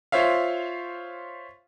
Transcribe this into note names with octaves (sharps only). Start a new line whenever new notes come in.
F4 C5 C#5 E5 F5